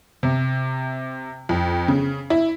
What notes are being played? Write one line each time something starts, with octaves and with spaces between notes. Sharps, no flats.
C3
F2
C#3
E4